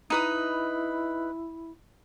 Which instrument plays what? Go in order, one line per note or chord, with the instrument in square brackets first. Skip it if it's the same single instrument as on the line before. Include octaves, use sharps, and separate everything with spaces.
[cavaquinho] D#4 B4 D#6 [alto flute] E4